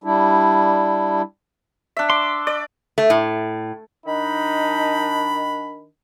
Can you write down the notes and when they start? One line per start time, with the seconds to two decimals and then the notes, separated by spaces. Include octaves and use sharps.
0.04 G3 D4 E4
1.97 D4 E5
2.10 C6 D6
2.47 D5
2.98 A3
3.10 A2
4.06 D#3 D4 D#4 B5